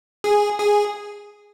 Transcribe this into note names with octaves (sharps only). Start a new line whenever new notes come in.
G#4
G#4